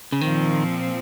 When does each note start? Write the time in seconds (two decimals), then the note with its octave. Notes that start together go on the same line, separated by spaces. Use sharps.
0.12 C#3
0.21 A#2 D#3 F3 C4